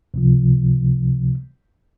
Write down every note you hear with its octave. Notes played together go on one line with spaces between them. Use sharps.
C#2 C3 F3